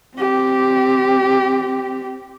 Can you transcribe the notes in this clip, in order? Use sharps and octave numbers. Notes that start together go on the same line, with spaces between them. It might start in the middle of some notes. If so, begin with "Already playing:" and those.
C4 G4